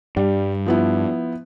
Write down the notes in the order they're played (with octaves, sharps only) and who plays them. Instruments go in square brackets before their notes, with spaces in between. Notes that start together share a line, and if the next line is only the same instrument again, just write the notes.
[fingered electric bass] G2 [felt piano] G3
[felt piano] F3 B3 E4